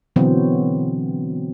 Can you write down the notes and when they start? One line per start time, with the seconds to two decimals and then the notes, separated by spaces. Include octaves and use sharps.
0.16 B2 D3 E3 F#3 B3 C4